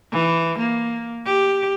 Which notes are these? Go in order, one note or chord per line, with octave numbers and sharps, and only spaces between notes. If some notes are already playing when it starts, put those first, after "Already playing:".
E3
A#3
G4